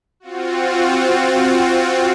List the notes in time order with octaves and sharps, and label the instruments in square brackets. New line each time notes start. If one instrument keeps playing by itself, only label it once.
[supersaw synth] C4 F4 F#4